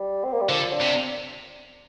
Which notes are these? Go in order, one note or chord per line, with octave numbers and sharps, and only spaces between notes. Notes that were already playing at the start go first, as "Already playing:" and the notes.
Already playing: G3
C4
A#3
G3
D3 F3
D4
C3